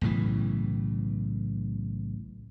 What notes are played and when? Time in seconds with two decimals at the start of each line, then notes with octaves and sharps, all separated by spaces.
0.01 B1 A2 C#3 E3